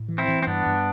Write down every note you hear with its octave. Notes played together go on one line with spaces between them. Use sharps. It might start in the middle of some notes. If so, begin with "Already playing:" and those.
Already playing: A2
E3
C4 E4
E3
C4
G2 B3 D4
G2